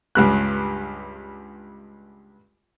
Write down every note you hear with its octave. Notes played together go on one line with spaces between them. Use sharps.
C#2 G2 F#6